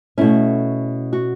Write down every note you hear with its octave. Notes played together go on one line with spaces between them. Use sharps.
B2 A3 C#4 E4
F#4